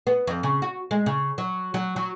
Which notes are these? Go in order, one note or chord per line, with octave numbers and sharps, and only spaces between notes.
B3
F2
C#3
F#4
G#3
C#3
F#3
F#3
F#3